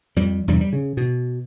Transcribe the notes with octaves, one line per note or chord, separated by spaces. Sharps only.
F2 G3
E2 G2 C3 G3
G3
C#3
B2